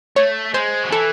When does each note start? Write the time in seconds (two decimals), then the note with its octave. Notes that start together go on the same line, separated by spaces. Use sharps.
0.16 A3 C#5
0.54 G#3 C5
0.84 F#3
0.91 E3 A4